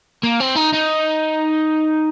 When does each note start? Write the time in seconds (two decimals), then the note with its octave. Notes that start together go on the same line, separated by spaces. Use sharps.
0.23 A#3
0.41 C4
0.56 D#4
0.74 D#4